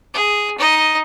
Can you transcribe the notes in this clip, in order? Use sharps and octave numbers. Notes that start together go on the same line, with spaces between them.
G#4
D#4 D#5